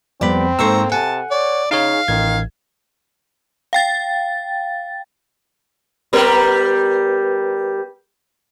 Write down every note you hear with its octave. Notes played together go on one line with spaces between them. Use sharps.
F2 G3 B3 C4 D5 B5
G#2 A#3 A4 C5 A#5 C#6 E6
C3 F#5 G#5 A5
C#5 D5
C#3 D#4 G#4 C#5 F5
A1 D#3 G#6
F5 G5 A6
G3 B3 A#4